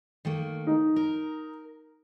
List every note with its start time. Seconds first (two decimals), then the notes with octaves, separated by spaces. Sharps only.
0.25 D#3 A3 A#3
0.67 D#4
0.96 A#4